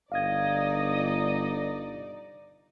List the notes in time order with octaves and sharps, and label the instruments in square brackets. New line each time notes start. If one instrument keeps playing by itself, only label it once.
[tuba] G1 [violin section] D#4 D5 [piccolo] D#5 [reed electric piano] F5 G#6